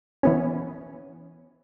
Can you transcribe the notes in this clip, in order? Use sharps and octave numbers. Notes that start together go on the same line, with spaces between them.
E3 B3 C#4